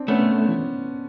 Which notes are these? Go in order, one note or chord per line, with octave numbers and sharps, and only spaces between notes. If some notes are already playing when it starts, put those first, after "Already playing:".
Already playing: C4 D4
A3 B3 C#4
E3